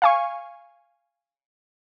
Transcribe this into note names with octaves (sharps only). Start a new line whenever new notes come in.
F5 G#5 C#6